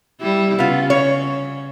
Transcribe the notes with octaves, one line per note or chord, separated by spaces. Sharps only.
G3 E4
C#3 B3 F4
C#5